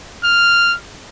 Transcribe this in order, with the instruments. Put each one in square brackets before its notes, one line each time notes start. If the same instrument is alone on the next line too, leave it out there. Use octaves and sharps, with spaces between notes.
[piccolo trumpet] F6